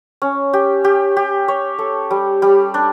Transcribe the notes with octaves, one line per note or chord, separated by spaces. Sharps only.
C#4
G4
G4
G4
C#5
A4
G3
G3
D4